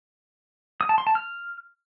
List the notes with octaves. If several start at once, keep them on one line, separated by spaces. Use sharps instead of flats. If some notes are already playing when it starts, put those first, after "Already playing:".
D#6
A5
C6
A5
F6